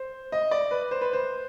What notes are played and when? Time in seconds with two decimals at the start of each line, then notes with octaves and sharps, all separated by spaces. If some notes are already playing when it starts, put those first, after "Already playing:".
Already playing: C5
0.32 D#5
0.51 D5
0.71 B4
0.91 C5
1.01 B4
1.13 C5